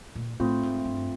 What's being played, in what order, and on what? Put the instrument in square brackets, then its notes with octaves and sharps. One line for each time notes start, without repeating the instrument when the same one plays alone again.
[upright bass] A#2
[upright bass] A2 [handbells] A3 C4 F4
[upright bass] G#2
G2